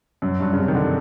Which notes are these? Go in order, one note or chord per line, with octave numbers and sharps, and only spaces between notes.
F#2
G2
C#3
C3
D#3
D3